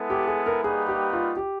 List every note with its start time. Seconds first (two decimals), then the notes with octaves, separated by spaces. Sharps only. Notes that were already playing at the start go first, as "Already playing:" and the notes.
Already playing: G#3 B3 E4 A4
0.10 G4
0.27 G#4
0.46 A#4
0.64 G3 A#3 D#4 F#4 G#4 B4
0.88 G4
1.13 F4
1.37 G4